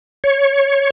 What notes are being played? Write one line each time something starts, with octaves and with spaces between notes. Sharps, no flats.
C#5